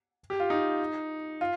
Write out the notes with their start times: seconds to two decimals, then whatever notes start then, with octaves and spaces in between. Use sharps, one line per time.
0.30 G4
0.40 F4
0.50 D#4
1.41 F4